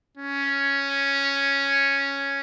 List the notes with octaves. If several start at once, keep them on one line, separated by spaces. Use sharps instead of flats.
C#4